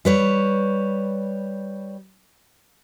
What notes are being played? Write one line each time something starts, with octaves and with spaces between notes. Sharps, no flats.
G3 B4 C#5